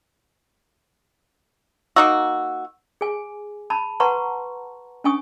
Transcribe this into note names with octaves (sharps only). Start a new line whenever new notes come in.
A#3 D#4 F#4 E6
G#4 G#5
A5 B5
B4 F#5 A5 A#5 C6 C#6
C#4 D4 G#5 C#6 D#6